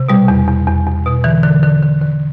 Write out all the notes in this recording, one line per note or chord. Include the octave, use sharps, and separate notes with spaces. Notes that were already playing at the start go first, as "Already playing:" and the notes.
Already playing: C3
B2 G3
E2
E2
E2
E2
B2
D3 E3
D3
D3
D3
D3